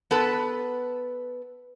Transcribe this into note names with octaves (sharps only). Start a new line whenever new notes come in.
B3 A4 B4